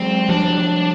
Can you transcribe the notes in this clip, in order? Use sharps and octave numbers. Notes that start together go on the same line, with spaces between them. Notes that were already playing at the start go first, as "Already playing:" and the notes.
Already playing: F#3 G#3 C4
F3 G3 D4